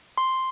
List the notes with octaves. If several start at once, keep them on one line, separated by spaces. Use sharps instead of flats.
C6